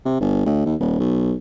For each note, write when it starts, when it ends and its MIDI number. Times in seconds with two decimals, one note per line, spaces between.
0.05 0.19 48
0.20 0.45 31
0.46 0.62 38
0.66 0.75 39
0.80 1.00 27
1.00 1.33 35